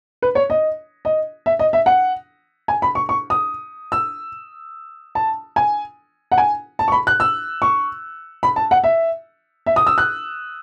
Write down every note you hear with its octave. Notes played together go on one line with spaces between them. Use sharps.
B4
C#5
D#5
D#5
E5
D#5
E5
F#5
G#5
B5
C#6
C#6
D#6
E6
A5
G#5
F#5
G#5
A5
C#6
B5
F#6
E6
C#6
B5
A5
F#5
E5
E5
D#6
E6
F#6